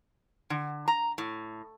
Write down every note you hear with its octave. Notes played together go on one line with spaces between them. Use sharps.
D3
A#5
A2